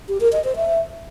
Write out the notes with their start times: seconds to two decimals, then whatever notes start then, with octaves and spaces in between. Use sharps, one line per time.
0.09 G4
0.21 A#4
0.32 D#5
0.44 C5
0.56 E5